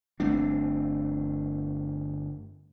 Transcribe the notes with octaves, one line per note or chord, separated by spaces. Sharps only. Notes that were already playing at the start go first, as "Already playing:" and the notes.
G1 A3 C4 D4